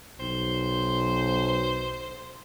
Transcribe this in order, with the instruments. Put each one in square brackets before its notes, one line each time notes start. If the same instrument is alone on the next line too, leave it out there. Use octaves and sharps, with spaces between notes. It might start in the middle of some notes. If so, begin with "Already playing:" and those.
[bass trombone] B1 [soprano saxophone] C5